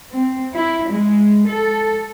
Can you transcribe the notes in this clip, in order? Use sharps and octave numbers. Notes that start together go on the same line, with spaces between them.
C4
E4
G#3
A4